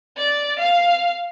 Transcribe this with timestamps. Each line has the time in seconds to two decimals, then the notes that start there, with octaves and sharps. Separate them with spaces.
0.17 D5
0.59 F5